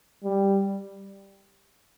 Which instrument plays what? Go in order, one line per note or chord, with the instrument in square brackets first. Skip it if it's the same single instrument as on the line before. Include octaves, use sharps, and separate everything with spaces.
[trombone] G3